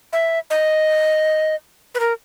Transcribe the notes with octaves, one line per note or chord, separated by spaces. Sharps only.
E5
D#5
B4
A#4